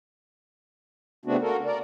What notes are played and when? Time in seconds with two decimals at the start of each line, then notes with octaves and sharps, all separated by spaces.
1.26 C#3 A3 B3 C4 D4 F#4
1.42 A#3 F#4 A4 A#4
1.65 A#4 D5